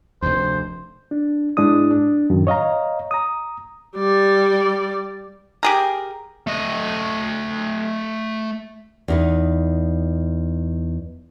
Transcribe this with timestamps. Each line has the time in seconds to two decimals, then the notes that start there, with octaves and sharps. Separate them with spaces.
0.22 F1 D2 C5
1.11 D4
1.57 G#2 G#3 D4 E4 D#6
1.91 D4
2.30 F#2 A2 D#3
2.47 C#5 D#5 F5 A#5
3.11 A#5 D#6
3.96 G3 D5
5.63 G4 G#4 A#4
6.47 A3 D#5
9.08 E2 D#4 B4